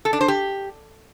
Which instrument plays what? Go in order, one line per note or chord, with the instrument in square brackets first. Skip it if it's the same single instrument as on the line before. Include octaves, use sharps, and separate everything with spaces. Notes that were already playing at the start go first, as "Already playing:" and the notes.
[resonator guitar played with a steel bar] A4
D4
C5
G4